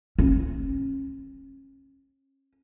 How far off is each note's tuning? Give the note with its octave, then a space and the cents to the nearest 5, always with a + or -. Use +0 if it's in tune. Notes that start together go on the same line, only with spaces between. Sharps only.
C#4 -35